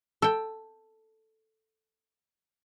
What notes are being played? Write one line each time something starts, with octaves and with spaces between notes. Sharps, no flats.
A4 G5